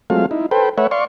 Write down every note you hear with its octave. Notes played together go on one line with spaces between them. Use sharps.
F#3 G#3 A3 C4 F4 F5
D#4 E4
A4 B4 C5 G5
A3 B4 C#5 E5 F#5
D5 F5 C6 C#6